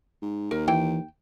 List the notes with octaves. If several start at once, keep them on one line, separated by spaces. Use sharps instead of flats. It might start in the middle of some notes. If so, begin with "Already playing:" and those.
G#2
D#2 A#4
E3 G5